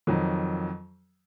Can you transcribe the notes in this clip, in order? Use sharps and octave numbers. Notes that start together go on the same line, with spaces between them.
F2 D#3 F#3